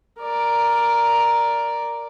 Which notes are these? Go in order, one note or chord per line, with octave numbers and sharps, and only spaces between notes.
A#4 D5